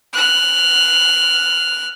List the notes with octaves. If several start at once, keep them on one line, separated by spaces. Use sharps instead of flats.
F6 F#6